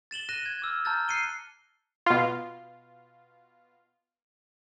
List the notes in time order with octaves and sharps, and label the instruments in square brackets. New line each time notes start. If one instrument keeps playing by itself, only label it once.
[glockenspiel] A6 E7 F#7 G7
F#6 A#6 D#7 E7
G#6
D6 E6 F6
A5 A#5 F6 G6 A6
F#6 C7 C#7 D#7 G7
[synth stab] B2 F4